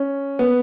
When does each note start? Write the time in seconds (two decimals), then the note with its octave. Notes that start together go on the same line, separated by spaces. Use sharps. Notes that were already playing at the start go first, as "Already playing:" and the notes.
Already playing: C#4
0.39 B3